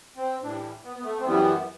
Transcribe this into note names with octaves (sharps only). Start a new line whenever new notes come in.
C4
A2 E3 G3 D4
B3
B3
A3
C4
F#2 E3 G3 B3